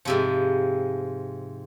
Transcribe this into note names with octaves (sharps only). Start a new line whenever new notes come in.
G#2 C3 F3